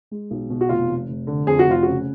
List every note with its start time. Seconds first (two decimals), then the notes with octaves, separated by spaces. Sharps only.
0.11 G#3
0.31 B1
0.50 B2
0.61 F#4
0.69 F1 F4
0.89 F1
1.09 F1
1.27 D3
1.47 F2 G#4
1.59 F#4
1.66 F1 F4
1.82 C#3 F#4